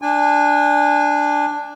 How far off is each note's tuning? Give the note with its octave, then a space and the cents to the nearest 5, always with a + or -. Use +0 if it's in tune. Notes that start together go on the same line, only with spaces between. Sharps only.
D4 +0 G#5 -25